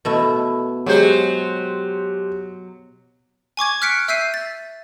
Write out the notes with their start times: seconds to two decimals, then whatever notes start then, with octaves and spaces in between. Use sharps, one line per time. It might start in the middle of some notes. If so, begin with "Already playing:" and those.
0.05 B2 A3 E4
0.86 F#3 G#3 G4 C5
3.57 G#5 C#6 D6 G#6
3.82 F6 F#6 B6 C#7 D7
4.08 E5 E6 G6 B6 C7 D#7
4.34 A6